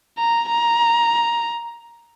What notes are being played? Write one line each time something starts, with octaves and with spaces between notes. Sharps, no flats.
A#5
A#5